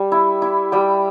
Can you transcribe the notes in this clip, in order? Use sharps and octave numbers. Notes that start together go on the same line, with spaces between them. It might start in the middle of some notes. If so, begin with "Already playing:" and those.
Already playing: G3
E4
E4
G3 G5